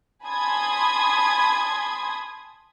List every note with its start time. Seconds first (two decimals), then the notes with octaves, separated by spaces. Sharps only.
0.25 G#5 A5 B5 C6 D#6 G#6